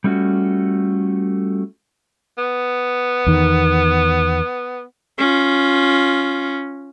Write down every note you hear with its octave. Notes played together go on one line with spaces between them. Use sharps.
G3 A3 C#4 F4 F#4
B3
E2 D#3
C#4 F4